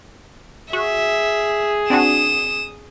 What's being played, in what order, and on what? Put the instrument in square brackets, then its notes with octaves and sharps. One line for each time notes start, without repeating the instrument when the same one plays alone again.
[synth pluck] F#4 [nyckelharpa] G#4 [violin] E5
[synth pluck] C4 D4 F#4 [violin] D#6 E7